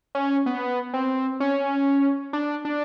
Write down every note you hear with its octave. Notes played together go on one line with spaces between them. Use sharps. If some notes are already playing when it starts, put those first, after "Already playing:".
C#4
B3
C4
C#4
D4
D4